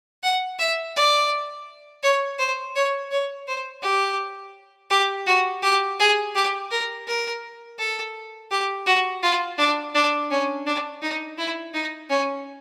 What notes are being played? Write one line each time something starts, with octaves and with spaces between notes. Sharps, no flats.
F#5
E5
D5
C#5
C5
C#5
C#5
C5
G4
G4
F#4
G4
G#4
G4
A#4
A#4
A4
G4
F#4
F4
D4
D4
C#4
D4
D#4
E4
D#4
C#4